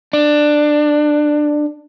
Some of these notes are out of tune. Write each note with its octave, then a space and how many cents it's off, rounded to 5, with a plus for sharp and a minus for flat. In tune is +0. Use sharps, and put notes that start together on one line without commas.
D4 +15